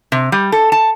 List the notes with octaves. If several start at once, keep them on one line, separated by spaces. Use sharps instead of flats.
C3
G3
A4
A5